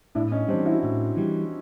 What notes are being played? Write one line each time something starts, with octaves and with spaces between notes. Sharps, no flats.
A2 D4 E4
C#4 D#4
E3 G3 C4 D4
E4 F#4
A2
E3 G3